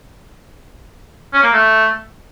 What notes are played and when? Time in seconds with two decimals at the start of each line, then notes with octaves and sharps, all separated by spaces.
1.33 C#4
1.43 A#3
1.53 A3